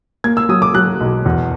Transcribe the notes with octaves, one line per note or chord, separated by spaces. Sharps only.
A#3 G#6
E6
F#3 D#6
D6
F#3 F#6
B1
E2